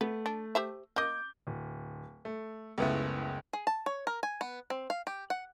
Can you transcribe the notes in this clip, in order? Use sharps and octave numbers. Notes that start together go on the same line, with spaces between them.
A3 B3
D4
G4 C5 E5
A#3 D#5 D6 G6
D1
A3
F#1 C#2 A3 B3 E4
G#4
A5
C#5
A#4
G#5
B3
C4
F5
G4
F#5